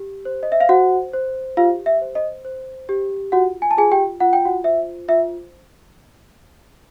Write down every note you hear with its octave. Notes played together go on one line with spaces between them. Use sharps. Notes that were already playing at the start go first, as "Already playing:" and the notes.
Already playing: G4
C5
D#5
E5
F5
F#4 C5 F#5
C5
F4 G4 F5
E5
C5
D#5
C5
G4
F4 F#4 F#5
G#5
A5
F4 G#4 G#5
G4 G5
F4 F#5
G5
F#4 F#5
C5 E5
F4 E5